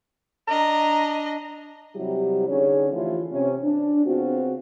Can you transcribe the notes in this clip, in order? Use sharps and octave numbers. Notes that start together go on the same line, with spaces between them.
D4 D#5 A#5
C3 F#3 G3 E4 G4
D3 C#4 D#4 G#4 C#5
E3 F3 A3 E4 F4 G4
C3 C#4
D4
C#3 B3 C4 F4 F#4